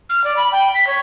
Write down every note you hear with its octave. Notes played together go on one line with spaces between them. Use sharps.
F6
D5
B5
G5
B6
C#5